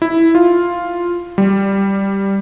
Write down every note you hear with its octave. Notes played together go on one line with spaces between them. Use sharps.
E4
F4
G3